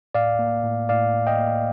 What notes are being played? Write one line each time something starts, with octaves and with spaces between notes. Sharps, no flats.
A2 D5 F5
A#3
A2
A2 D5 F5
A2
D#5 G5
A#3